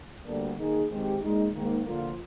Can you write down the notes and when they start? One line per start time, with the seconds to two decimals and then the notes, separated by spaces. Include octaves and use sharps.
0.25 D2 D3 G3 A#3 D4
0.57 D#3 A#3 D#4 G#4
0.89 D#3 G#3 C4 G4
1.20 A#2 G#3 D#4
1.53 G#2 D#3 A#3
1.84 D3 F3 A#3 F4